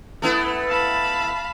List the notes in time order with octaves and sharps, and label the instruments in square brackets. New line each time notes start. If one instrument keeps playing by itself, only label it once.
[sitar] A3 B3 E4
[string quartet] F5 A5 B5